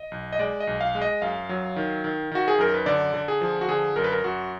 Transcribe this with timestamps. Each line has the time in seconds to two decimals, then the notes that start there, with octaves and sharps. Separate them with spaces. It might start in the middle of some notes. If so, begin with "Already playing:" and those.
Already playing: D#5
0.12 B1
0.33 D#5
0.39 G#3 D5
0.60 D#5
0.67 B1
0.81 F5
0.95 G#3
1.02 D#5
1.22 F#2 F5
1.49 F#3
1.76 D#3
2.04 D#3
2.31 D#3 F#4
2.48 G#4
2.58 F#2 A#4
2.74 B4
2.86 D3 D5
3.14 D3
3.28 G#4
3.41 F3
3.61 F#4
3.68 D3 G#4
3.96 F#2 A#4
4.04 B4
4.12 A#4
4.24 F#2 F#4